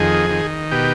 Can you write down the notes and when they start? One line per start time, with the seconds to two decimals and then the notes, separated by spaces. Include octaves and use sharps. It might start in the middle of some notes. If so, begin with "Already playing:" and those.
Already playing: F2 D#3 G#4
0.30 D#3
0.71 B2 G4